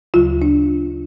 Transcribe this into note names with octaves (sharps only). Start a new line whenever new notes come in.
D2 C#3 F#3 F4
D4